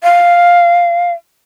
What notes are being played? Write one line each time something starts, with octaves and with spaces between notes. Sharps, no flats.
F5